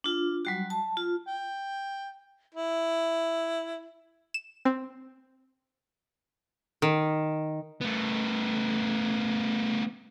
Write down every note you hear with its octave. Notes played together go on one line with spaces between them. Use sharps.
D4 F4
F#3 G3 F#4
A5
F4
G5
E4
E7
C4
D#3
A3 B3